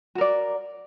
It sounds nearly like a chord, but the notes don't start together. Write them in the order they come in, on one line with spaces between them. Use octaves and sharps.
F#4 A#4 D5